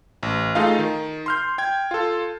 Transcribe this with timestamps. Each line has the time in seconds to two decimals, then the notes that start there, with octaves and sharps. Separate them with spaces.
0.23 A1
0.55 A3 D#4 F4 G#4 D#5 F5
0.79 D#3
1.26 C6 F6 G6
1.58 G5 G#6
1.91 F4 A4